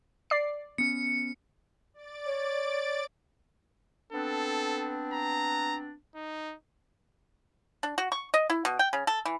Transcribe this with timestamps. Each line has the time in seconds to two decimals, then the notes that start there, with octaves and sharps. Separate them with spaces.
0.30 D5 C7
0.78 B3 C#4 C#7
1.94 D5 A6 D7
2.26 C#5
4.12 B3 C4 D4 A4
5.13 A#5
6.15 D#4
7.83 D4
7.98 F#4
8.12 C#6
8.34 D#5
8.50 E4
8.65 B2
8.79 G5
8.93 C#3
9.07 A4
9.25 E3